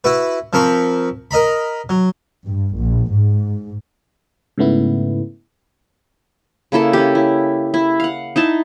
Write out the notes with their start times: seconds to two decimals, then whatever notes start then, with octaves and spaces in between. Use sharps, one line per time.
0.04 E4 F#4 B4
0.53 F3 C4 A#4 B5 C#6
1.31 A#4 D#5 A#5 B5
1.89 F#3
2.47 G2
2.77 A#1
3.11 G#2
4.58 G#2 C#3 A3 B3 E4
6.72 C#3 A#3 E4 A4
6.93 C#4 G4
7.15 E4
7.74 E4
8.00 F5 F#5
8.36 D#4 E4 A5